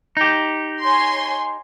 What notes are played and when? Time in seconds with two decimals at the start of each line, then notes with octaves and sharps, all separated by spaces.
0.17 D#4 G4
0.82 C#5 G#5 C6